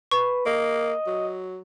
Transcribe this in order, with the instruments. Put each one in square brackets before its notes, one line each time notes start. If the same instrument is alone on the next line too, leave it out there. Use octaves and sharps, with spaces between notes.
[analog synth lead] B4 [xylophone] C#6
[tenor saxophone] A#3 [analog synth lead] D#5
[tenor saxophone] F#3